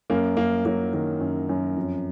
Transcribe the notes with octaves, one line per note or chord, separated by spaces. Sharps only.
F#2 A#3
F#2 A#3
F#3 A#3
D#3 A#3
F#2
F#2
F2